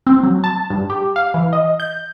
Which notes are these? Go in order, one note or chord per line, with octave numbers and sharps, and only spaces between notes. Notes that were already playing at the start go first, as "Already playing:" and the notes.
C4
F#3
A5
G2
G4
F5
E3
D#5
G6